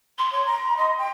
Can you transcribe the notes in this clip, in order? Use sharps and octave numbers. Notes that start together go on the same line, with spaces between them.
C6
C#5 C6
A#5
D#5
G5